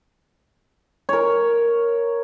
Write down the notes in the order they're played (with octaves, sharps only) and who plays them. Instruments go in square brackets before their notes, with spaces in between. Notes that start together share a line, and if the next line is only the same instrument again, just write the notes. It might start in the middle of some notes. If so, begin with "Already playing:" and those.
[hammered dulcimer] A#4 C#5